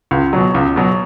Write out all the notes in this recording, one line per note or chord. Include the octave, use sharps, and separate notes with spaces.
C#2
B2 F#3
C#2
B2 F#3